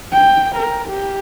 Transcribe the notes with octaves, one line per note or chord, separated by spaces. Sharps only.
G5
A#4
G4